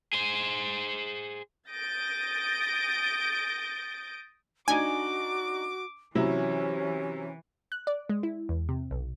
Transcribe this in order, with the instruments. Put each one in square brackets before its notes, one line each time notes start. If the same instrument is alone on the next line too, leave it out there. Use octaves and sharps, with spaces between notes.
[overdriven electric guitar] G#4 C5
[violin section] D#6 G6 A6 A#6 D7
[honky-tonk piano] D4 D#4 [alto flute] F#4 [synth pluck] G#5 [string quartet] D6
[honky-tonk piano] C3 F#3 E4 [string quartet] E3 [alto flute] C#4
[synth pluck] F#6
D5
G#3
E4
E2
C3
B1